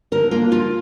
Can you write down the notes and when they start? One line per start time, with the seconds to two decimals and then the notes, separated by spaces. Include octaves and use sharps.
0.12 D3 A#4
0.31 A#3 D4 F4
0.51 D3 F4